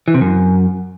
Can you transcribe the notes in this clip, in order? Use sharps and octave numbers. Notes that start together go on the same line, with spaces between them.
E3
C3
F#2